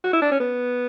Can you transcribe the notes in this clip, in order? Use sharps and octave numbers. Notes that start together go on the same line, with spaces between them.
F#4
E4
D4
C#4
B3